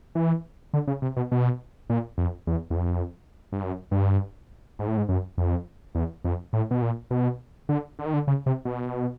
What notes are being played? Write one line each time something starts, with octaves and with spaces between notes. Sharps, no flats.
E3
D3
C#3
C3
B2
B2
A#2
F2
E2
E2
F2
G2
F#2
G2
G#2
A2
G#2
F#2
F2
E2
F2
A2
B2
A#2
B2
D3
D3
D#3
D3
C#3
C3
B2